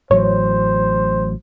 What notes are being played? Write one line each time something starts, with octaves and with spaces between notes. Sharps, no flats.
A1 A2 F#3 C5 C#5